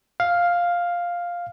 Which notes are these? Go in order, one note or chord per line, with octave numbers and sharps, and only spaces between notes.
F5